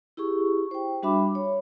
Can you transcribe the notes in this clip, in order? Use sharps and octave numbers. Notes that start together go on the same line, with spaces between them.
E4 G4 G#4 C#6
C5 G5
G3 D4 F#4 E5 B5 D6
C#5